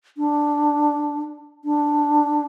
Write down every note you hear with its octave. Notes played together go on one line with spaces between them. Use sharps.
D4
D4